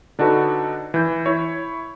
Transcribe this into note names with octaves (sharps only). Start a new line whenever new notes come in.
D3 D4 D#4 F#4 A4 B4
E3 G6
E4 C#5